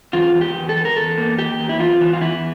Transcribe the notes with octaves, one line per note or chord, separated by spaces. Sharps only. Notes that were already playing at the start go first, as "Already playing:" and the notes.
E2 F4
E2
G4
E2
A4
E2
A#4
E2 A4
A#3
A#3 G4
E2
E4
E2 F4
E3
F4
E2 E4